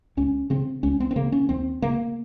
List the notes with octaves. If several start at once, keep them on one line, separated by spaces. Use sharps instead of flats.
C#2 C#4
C#3 C4
C#2 C#4
C4
C4
C#3 A#3
C#4
D#2 C4
C#3 A#3